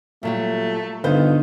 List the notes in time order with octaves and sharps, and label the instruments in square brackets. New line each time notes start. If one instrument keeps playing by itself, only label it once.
[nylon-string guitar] A#2 F#3 G3 [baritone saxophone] A3
[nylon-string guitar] G2 F4 C5 [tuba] D3 [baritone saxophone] D#3 [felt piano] B3